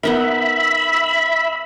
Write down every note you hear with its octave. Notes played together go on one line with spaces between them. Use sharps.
B3 D#4 A#4 E5 B5